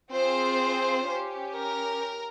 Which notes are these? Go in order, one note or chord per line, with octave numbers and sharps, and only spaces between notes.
C4 F4 G#4 C5
C#4 G4
A#4